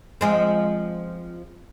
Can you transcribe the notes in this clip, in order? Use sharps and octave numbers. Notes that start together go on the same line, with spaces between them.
F3 G#3 C4